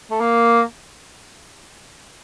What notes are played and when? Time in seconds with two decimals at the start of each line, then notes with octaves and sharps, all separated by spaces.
0.11 A3
0.20 A#3